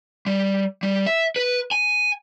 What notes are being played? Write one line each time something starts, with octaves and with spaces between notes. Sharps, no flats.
G3
G3
E5
B4
G#5